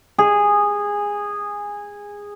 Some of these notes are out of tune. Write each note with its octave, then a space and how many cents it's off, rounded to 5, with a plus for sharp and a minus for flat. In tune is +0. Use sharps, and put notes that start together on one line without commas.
G#4 -15